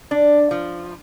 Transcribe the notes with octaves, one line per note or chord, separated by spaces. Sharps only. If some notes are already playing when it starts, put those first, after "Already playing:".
D4
F3